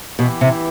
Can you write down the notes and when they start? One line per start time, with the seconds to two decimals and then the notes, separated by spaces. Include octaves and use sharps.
0.18 B2 E3 B3 E4 G4
0.41 C3